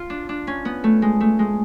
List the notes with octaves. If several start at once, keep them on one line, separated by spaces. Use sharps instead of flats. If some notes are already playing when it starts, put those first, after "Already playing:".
Already playing: F4
D4
D4
C#4
B3
A3
G#3
A3
G#3